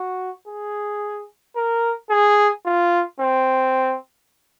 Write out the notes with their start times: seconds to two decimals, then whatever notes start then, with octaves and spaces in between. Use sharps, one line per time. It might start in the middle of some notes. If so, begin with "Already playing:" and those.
Already playing: F#4
0.47 G#4
1.56 A#4
2.11 G#4
2.66 F4
3.20 C4